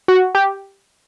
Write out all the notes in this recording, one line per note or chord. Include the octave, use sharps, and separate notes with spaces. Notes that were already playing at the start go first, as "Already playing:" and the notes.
F#4
G4